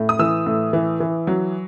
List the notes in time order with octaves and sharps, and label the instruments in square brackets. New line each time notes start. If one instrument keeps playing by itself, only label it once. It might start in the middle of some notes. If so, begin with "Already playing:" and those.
Already playing: [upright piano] A2
D#6
E3 E6
A2
E3
E3
F#3